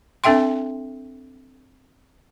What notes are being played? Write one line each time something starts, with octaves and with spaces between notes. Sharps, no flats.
C4 D4 A4 E5 G5 C6